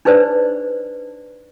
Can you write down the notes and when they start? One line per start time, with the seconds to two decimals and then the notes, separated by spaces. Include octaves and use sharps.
0.05 D4 D#4 G#4 B4 C5 D5